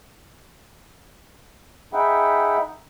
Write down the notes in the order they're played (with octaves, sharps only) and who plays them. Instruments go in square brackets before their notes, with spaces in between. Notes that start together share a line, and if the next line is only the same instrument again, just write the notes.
[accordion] D#4 G#4 E5 F#5 G5 B5